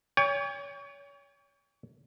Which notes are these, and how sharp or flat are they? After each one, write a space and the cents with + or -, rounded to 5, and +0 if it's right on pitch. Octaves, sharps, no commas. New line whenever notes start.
C#5 +30 G5 +45